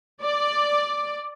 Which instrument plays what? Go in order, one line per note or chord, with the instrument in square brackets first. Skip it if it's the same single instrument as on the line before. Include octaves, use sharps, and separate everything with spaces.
[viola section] D5